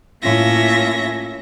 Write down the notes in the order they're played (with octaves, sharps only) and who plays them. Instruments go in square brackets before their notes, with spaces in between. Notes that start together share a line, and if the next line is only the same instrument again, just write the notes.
[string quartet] A2 A#3 C#4 F4 E5 A#6